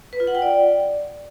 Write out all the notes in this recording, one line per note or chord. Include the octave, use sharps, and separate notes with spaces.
B4
F4
F#5
G5
D5